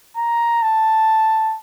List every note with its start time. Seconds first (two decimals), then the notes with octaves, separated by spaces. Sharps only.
0.17 A#5
0.62 A5